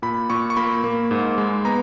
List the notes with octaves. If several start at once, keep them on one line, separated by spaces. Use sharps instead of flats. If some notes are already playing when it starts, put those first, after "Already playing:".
A#2 B5
A#2 C#6
C#6
A#3 B5
A#3
G#2
G#3
B3 A#5